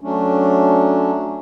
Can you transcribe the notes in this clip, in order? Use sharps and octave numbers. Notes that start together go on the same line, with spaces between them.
F#3 A3 C#4 D4